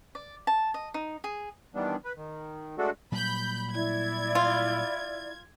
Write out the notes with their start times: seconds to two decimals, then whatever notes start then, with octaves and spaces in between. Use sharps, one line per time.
0.15 D5
0.47 A5
0.74 D#5
0.94 D#4
1.24 G#4
1.75 D#3 E3 G3 B3 D4
2.05 B4
2.16 D#3
2.78 G#3 A3 D4 F#4 A4
3.12 A#2 F#3 G3 B5 G6
3.74 E4 D5 G#6
4.35 F4